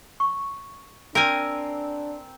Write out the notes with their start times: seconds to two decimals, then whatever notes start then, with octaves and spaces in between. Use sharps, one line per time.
0.20 C#6
1.15 C4 D4 A#4 G#5